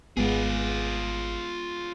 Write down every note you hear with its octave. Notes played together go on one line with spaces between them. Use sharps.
G#1 G#3 B3 F4 G#4